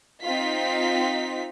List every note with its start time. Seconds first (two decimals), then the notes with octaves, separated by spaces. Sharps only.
0.24 C4 D#4 F4 B6